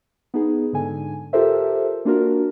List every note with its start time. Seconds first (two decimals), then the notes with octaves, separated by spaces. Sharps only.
0.34 B3 D#4 G#4
0.73 G#2 D3 G#5
1.33 F4 G4 A4 A#4 C5 E5
2.05 A#3 D4 F4 F#4 A#4